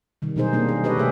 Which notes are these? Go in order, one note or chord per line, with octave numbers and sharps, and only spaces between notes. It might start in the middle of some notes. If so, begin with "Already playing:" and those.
C3 D#3 G3
B2 F#3 D#4 G#4 C5
A#3 C4 D4 D#4
G#4
G4 A4 B4 C#5 D#5
C3 A3 G#4 E5